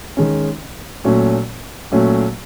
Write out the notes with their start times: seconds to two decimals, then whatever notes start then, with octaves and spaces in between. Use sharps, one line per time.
0.17 D#3 G#3 C#4
1.04 A#2 F#3 A3 C#4
1.92 A#2 F#3 A3 C#4